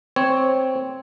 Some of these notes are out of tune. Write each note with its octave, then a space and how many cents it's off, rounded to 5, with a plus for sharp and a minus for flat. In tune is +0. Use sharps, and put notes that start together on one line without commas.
C4 +0 C#5 +0